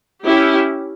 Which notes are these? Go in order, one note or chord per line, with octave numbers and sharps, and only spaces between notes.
C#4 E4 G4